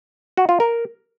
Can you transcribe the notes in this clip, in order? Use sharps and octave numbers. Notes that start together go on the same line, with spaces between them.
F#4
F4
A#4